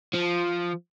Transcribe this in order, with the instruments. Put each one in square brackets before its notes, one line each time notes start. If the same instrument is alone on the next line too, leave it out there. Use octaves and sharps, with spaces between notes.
[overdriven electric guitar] F3